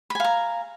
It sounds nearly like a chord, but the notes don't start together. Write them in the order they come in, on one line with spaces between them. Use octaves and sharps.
B5 G#5 F5 A#5